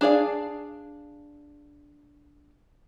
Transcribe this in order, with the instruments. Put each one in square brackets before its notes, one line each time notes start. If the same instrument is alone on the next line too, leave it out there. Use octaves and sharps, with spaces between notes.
[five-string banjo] D4 G#4 D5 F5